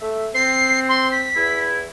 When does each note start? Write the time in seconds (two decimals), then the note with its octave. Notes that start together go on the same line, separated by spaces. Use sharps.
0.02 A3 E5
0.35 C4 C7
0.89 C6
1.12 B6
1.36 E2 E4